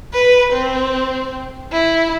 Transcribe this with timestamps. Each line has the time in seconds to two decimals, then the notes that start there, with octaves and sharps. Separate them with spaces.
0.13 B4
0.52 C4
1.72 E4